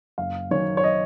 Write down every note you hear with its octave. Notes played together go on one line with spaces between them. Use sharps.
F#1 F5
F#2 D#3 C#5
C#5
D#5